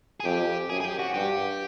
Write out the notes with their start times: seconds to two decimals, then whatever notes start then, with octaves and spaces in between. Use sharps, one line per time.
0.20 G#4
0.25 F2 G4
0.69 F#2 G#4
0.80 G#4
0.85 G4
0.99 F#4
1.14 G2 G4